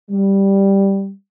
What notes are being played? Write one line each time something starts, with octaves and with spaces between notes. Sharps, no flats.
G3